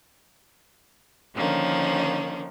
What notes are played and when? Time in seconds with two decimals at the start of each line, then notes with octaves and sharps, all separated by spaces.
1.34 D3 D#3 F3 A#3 C#4